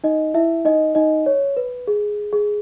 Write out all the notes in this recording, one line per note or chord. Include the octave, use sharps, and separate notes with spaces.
D#4 D#5
E4 E5
D#4 D#5
D#4 D#5
C#5
B4
G#4
G#4